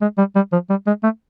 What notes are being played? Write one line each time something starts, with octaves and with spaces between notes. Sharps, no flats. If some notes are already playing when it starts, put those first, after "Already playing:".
G#3
G3
G3
F3
G3
G#3
A3